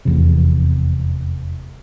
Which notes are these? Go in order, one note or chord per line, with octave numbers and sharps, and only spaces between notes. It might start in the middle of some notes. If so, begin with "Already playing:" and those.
F1 E2 C3